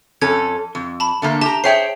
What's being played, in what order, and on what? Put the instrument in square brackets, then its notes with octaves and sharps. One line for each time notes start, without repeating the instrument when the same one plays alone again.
[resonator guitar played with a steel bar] F2 C#4 A4 [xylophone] G#6
[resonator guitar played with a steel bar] F2
[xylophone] A5 B5
[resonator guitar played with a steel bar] D3 A3 A#3
[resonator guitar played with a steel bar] G4 A#5 [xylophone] A5
[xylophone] G#4 E5 C7 [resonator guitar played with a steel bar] C5 C#5 G5